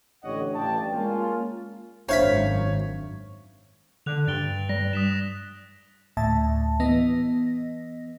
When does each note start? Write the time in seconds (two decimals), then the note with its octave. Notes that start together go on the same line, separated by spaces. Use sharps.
0.24 A1 D3 G4 C#5 D#5 F#5
0.54 A1 G2 D5 G5 A5
0.93 G#3 A#3 C#4 F4
2.09 G#1 F#2 D4 C5 C#5 E5 F5 B5
4.06 D3 F#6 F7
4.28 G2 A6 D7 G7
4.69 G3 A#6
4.93 D#6 B6 E7
6.17 D2 A2 E5 A5
6.80 E3 B3 D#5 A#6